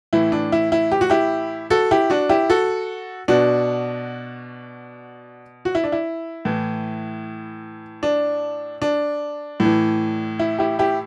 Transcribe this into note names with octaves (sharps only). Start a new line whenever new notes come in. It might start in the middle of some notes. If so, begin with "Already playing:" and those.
A2 E3 E4
D4
E4
E4
G4
F#4
E4 G4
F#4 A4
E4 G4
D4 F#4
E4 G4
F#4 A4
B2 D4 F#4
F#4
E4
D4
E4
A2 E3
D4
D4
A2
E3
E4
E4 G4
E4 G4